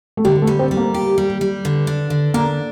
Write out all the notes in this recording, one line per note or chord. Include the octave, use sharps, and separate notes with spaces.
A3
D3 G3
A3
G3
C4
G3
A#3
G4
G3
G3
D3
D4
D3
A#3 D4